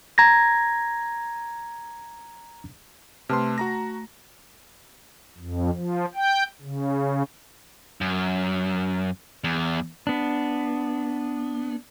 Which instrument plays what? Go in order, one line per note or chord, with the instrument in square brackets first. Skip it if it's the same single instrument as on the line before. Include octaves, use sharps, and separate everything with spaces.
[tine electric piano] A#5 G#6 A#6
[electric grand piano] C3 B4 C6 [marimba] A3 A5 F6
[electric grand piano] F#4 A#5 A#6
[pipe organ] F2
F3
G5
C#3
[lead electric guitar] F#2
E2
[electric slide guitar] B3 D4